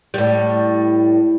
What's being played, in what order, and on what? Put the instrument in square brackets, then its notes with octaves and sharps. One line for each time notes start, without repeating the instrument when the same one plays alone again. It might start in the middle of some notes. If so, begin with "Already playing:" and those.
[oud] A2 G3